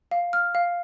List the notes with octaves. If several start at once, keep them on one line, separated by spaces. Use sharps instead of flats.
F5
F6
F5